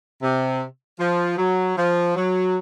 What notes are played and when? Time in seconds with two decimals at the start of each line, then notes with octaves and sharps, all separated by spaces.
0.22 C3
0.99 F3
1.38 F#3
1.77 F3
2.16 F#3